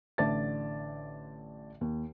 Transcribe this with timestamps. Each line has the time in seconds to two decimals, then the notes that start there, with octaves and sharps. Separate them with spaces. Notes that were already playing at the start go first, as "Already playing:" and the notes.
0.18 A1 D3 D5 E5 A5 A6
1.81 D#2